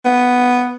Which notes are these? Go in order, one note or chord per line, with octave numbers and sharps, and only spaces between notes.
B3